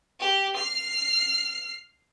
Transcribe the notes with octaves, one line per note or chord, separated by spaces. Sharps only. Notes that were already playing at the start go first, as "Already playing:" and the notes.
G4
F6 C7